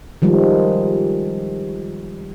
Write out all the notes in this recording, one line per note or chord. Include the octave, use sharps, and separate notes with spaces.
D#3 F3 G3 G#3